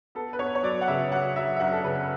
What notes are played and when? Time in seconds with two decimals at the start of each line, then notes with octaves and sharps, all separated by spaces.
0.15 B3 A4
0.33 B4
0.39 B3 C#5
0.55 C#5
0.63 F#3 D5
0.81 F#5
0.88 C#3 E5
1.12 F#3 F#5
1.36 F#3 E5
1.56 E5
1.60 F#2 F#5
1.72 A4
1.84 C#3 B4